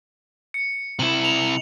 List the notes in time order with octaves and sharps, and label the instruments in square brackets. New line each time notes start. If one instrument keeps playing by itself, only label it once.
[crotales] C#7
[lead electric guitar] C3 E4 [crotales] F#7
[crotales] F7